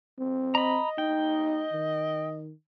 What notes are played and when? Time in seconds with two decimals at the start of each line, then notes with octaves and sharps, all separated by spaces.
0.19 C4
0.55 D#5 A#5 B5
0.98 D#4 G5
1.73 D#3